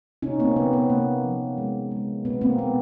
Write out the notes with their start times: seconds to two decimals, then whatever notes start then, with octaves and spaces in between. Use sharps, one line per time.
0.22 C3 C#4 D#4
0.40 A#3 C4
0.56 C3 B3
0.73 B3
0.90 C3 A#3
1.24 F3
1.58 G#3
1.91 G#3
2.25 B2 B3
2.41 A#3 C4
2.58 G#3 B3